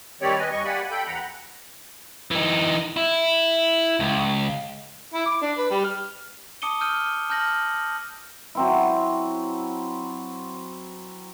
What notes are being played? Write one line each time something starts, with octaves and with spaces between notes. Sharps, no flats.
D#3 G3 C4 G4 C#5 D5
B4 D#5 G#5
D#2 G3 D#5 C#6
A#3 G4 D5 F#5 G#5 B5
A4 G5 B5 G6
D#2 E3 F#5 A#5 B5
E3 D#4
E4
C#2
E4
D6
D4
B4
G3
F6
A5 D6 D#6 C#7 D#7 G7
E6 F6 G6 D#7
A5 F6 G6 A#6 F#7
F#3 C4 E4